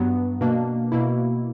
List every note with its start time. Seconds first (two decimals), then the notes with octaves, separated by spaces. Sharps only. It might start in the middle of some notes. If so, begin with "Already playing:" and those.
Already playing: G2 F#3 B3
0.41 B2 A#3 D4
0.92 B2 A#3 E4